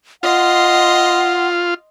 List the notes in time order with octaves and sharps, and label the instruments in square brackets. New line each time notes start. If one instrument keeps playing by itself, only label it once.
[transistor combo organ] F4 [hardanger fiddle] D#5 C6 [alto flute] F#5